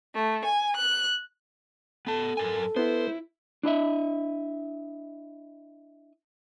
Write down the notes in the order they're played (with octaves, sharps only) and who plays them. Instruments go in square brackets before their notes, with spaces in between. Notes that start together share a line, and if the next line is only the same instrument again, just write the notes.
[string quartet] A3
G#5
F#6
[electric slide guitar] B3 A5 [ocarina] A4
[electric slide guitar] F#2 A#4 G#5
[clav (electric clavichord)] B3 [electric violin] E4 [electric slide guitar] C5
[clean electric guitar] D4 E4 D#5 E5